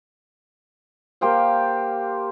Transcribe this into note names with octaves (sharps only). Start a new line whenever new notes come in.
A#3 G4 C5 F5